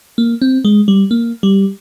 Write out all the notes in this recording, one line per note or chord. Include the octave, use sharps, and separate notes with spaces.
A#3
C4
G#3
G3
A#3
G3